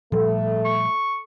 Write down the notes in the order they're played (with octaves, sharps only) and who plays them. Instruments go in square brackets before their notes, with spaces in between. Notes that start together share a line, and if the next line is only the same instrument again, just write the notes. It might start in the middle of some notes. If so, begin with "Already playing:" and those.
[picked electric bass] A#2 F3 G3 [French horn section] A3 [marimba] A4
[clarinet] C#6